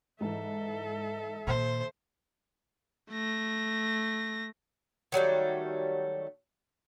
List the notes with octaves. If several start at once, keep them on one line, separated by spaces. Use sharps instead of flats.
G#2 E3 A4 E5
A#2 D#3 C5
A3 A#6
D#3 F#3 G3 A3